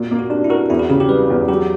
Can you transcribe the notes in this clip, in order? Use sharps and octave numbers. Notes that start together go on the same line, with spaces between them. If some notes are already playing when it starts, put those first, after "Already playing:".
Already playing: A#2 F#4
A#3
F#4
D4 G4
E4
F#4 A#4
E2 E4
F#4
C#3 G4
G4
G3 B4
E2
F#3 G4